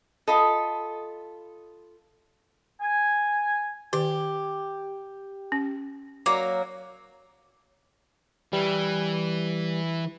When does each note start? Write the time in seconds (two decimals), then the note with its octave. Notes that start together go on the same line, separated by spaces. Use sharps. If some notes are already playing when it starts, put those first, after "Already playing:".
0.28 F4 A4 D#5 B5 D#6
2.81 G#5
3.93 D#3 G4
5.52 C#4
6.26 F#3 A#3 D6
8.53 E3 G3